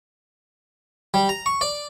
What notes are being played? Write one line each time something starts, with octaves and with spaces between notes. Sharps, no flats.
G3
A#5
C#6
D5